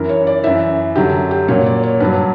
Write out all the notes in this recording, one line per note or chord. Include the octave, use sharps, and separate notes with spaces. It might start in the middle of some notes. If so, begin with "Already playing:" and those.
Already playing: F#2 E3 A#4
C#5
D5
F#2 E3 E5
F#2 D3 F#3 G4
G4
A#2 F#3 C#5
D5
C#5
G2 F#3 B4